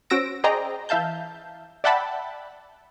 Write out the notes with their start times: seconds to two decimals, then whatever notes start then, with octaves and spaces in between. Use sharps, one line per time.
0.10 C#4 F#4 C5 E6 A#6 D7
0.44 G#4 C5 D5 D#5 G5 A#5
0.89 E3 E5 F5 A5 G6
1.84 D5 E5 F#5 G5 A5 B5